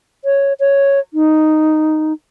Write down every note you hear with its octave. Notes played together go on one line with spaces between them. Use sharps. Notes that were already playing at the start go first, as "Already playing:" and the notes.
C#5
C#5
D#4